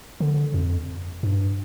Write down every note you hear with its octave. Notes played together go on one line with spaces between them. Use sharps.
D3
F2
G2